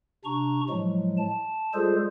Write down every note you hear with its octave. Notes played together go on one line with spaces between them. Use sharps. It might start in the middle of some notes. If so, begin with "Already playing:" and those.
C3 D4 A#5 C#6
A2 F3 F#3 G#3
A5
G3 G#3 F4 G#4 A4 C5